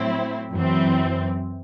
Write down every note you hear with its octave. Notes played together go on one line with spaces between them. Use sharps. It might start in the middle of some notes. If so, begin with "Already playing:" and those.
Already playing: A2 F#3 C4 E4
F#2 E3 C4